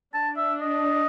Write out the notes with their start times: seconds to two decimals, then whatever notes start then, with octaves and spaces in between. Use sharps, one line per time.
0.14 D4 A5
0.37 E5
0.61 D#5